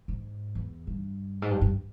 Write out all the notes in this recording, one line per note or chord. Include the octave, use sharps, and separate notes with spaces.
G#2
E2
G2
G#2
G2
G2